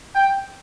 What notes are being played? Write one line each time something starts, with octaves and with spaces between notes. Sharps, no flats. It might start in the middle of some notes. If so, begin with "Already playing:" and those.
G5